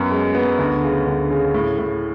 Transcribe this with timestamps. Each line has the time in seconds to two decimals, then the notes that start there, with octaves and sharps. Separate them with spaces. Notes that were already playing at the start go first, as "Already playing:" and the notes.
Already playing: F#2 B3
0.11 G#3
0.35 B3
0.59 D2
0.83 C#3
1.06 D2
1.30 C#3
1.54 A2
1.78 A2